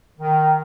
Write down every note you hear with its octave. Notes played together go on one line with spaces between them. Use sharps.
D#3